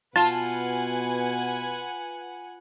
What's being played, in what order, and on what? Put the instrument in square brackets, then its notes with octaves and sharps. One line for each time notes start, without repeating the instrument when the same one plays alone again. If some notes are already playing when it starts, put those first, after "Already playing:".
[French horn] B2 [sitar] F4 [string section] B4 F#5 G#5 [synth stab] A5